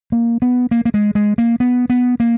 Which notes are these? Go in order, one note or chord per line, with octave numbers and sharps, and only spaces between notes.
A#3
B3
A#3
A#3
G#3
G#3
A#3
B3
B3
A#3